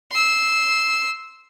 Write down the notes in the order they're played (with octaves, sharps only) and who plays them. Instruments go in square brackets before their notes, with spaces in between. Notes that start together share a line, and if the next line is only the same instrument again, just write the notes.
[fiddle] C6 E6